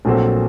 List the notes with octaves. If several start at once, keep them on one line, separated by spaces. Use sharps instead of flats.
A#1 A#2 F#3 A3 C4